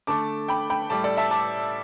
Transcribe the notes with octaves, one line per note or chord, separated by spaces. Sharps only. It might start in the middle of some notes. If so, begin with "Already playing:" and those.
D3 A3 A5 D6
G5 B5
G5 B5
A2 G3 A5 D6
A4 D5
E5 A5
A5 D6